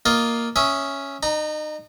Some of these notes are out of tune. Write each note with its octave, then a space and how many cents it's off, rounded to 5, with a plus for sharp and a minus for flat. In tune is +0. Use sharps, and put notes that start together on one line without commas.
A#3 +0 F4 +0 D#5 +0
C#4 +0 E5 +0 D#6 +0
D#4 -30 A#5 +5